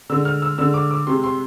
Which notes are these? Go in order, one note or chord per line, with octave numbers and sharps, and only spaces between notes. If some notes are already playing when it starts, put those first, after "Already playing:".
D3 G#3 E6
F6
E6
D3 G#3 E6
D6
D6
C3 G#3 C6
C6